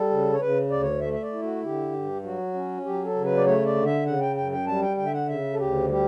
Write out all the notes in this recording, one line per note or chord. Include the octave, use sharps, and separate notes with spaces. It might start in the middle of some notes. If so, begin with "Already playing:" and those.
Already playing: G3 A4
C#3
C#5
C#3 B4
D2 D5
C#5
A3 E5
E5
D5
E4
F#4
D3 G4
G2
F#3 F#4
C#4
F#3 G4
A4
C#3
B4
D5
A3 C#5
D5
D3
E5
C#3 F#5
G5
F#2 G5
G5
G3 A5
G5
D3 G5
E5
F#5
C#3 E5
A4
D2 G4
G3 G4